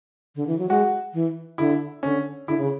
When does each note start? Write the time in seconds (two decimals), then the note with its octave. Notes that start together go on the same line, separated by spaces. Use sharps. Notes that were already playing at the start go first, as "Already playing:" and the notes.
0.36 D3
0.47 E3
0.58 F#3
0.69 G#3 F#4
1.14 E3
1.58 D3 E4
2.03 D3 C#4
2.48 D3 E4
2.58 C#3